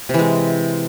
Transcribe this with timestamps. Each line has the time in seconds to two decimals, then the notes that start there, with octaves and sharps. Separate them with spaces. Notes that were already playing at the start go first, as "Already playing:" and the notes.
0.09 C3
0.14 E3
0.19 G#3